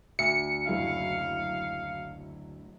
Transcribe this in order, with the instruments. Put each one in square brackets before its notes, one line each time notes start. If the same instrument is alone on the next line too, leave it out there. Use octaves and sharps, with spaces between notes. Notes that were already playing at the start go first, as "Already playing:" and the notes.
[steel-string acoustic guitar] D2 [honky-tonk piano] E5 [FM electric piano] C#7
[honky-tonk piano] F#1 F#3 E4 [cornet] F5